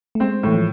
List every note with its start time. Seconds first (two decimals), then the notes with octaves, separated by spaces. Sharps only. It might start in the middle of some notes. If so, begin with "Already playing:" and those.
0.15 A3
0.20 G#3 C4
0.43 A2 E3
0.55 F3